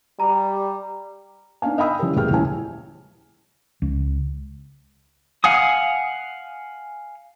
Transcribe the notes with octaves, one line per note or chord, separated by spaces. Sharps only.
G3 A#5
B3 D4 D#4 F5 G#5
D#5 F5 G5 B5 D#6 E6
E3 G3 C#4 G4 A#4
E1 A1 G4 G#4 G5 F6
D#1 E3 C#4 E4 G#5
C#2
F5 F#5 G#5 D#6